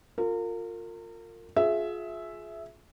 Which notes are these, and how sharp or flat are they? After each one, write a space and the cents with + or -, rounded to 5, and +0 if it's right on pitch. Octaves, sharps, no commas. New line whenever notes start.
F4 +20 A#4 -35
F4 +25 G#4 +25 E5 +0